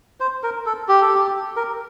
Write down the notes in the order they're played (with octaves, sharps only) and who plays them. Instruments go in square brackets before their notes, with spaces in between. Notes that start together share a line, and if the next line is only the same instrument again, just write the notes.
[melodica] C5
A#4
A4
G4
A4
G4
A#4